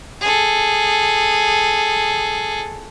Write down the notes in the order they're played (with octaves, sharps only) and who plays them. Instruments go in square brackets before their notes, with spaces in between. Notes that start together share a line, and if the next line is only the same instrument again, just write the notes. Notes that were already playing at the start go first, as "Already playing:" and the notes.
[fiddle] G#4 A4